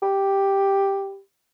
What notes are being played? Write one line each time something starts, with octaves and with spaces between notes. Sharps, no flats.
G4